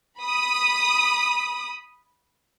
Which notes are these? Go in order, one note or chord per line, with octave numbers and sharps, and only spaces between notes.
B5 D#6